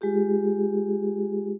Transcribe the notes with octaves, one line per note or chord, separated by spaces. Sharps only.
G#3 F4 G4 G#4